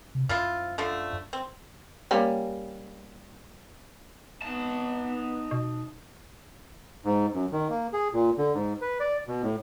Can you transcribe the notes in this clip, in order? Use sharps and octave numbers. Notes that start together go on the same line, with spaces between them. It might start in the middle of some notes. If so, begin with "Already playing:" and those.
C3
F#2 F3 E4 F4
D3 F3 A3
C4
G3 A#3 C#4
B3 D#4 A5
B2
G#2
F#2
D#3
A#3
G#4
A#2
D3
G#2
B4
D5
B2
A2